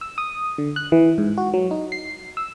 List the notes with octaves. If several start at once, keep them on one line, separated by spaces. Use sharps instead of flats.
E6
D#6
D3
F#6
E3
G#2
F#4
F#3
D#4
C7
E6